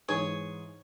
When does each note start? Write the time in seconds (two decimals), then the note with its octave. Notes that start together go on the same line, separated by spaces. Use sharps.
0.09 G#2 E3 G#4 C#5 G#5